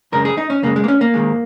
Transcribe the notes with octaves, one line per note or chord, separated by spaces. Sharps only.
F#2 C#3 G#3 A#4
G#4
D#4
C#4
F#2 C#3 G#3 A#3
G#3
A#3
C#4
A#3
G#2 D#3 G#3